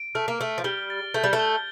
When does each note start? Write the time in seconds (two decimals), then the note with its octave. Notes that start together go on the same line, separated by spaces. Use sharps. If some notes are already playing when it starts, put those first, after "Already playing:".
Already playing: D7
0.15 A3 F6
0.28 A#3
0.40 A3 F6
0.58 F3
0.64 G3 G7
0.90 A6
1.14 A3 G6
1.24 G3
1.33 A3
1.39 G7